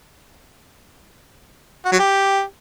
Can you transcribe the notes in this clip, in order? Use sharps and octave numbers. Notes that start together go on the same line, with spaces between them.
F#4
F#3
G4